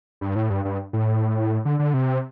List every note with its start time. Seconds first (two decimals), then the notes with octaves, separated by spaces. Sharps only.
0.21 G2
0.36 A2
0.50 G2
0.65 G2
0.93 A2
1.65 D3
1.79 D3
1.94 C3